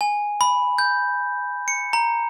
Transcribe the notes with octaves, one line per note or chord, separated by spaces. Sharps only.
G#5
B5
G6
C#7
A#5